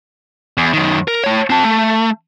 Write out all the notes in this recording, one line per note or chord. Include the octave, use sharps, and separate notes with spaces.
E2
F#2 D#3
A#4
A3 C#5
C4 A5
A3